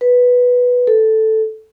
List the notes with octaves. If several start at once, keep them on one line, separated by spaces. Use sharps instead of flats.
B4
A4